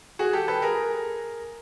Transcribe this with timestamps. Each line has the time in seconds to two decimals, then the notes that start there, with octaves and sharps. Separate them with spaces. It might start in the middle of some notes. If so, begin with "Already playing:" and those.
0.19 F#4 G#4
0.33 G4 A4
0.48 A4 B4
0.62 G#4 A#4